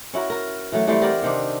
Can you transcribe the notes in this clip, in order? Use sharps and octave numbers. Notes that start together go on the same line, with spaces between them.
C#4 E4 F#4 A#4
A#4
E3 F#3 A3
E3 G3 A3 C4
G4 A#4 D5 F#5
C3 D#3 C4 D4